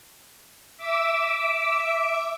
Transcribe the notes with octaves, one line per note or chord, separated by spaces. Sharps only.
E5 D6 E6